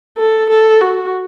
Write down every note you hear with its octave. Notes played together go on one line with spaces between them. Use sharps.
A4
A4
F#4